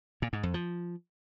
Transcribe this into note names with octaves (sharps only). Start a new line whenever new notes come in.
A#2
G#2
F2
F3